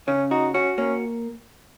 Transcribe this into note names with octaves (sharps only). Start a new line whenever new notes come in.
C#3 C#4
D#4 F#4
C#4 F#4
A#3 C#4